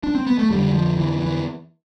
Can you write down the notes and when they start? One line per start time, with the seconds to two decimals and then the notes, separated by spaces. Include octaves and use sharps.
0.03 D4
0.15 C4
0.27 B3
0.39 A3
0.50 F2 D3 G3
0.73 F3
0.97 E3
1.21 E3